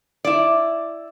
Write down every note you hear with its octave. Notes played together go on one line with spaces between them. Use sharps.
E4 D5